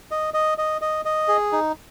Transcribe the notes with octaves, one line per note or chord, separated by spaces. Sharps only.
D#5
D#5
D#5
D#5
D#5
G#4
D#4